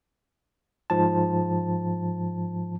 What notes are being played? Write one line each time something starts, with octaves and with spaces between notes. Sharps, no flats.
G#2 F3 A5